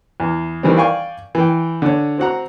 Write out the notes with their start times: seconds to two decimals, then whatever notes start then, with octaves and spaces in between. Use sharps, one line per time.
0.20 E2
0.63 D#3 E3 G3 C4
0.77 D5 F5 G5 G#5 C#6
1.35 E3 G5
1.82 D3 C#5
2.18 C4 F#4 F#5 A#5